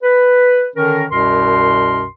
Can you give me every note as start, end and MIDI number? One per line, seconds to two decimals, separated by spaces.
0.03 0.67 71
0.76 1.05 50
0.76 1.05 51
0.76 1.05 61
0.76 1.05 70
1.11 2.05 36
1.11 2.05 42
1.11 2.05 47
1.11 2.05 70
1.11 2.05 84